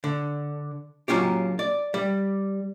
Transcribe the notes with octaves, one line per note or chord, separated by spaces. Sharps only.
D3
F#3 A#3 C#4 F4 G4
D5
G3